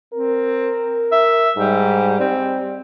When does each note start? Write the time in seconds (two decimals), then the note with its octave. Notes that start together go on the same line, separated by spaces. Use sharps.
0.14 C4 A#4
1.12 E5
1.57 G#2 G3
2.20 G3 C4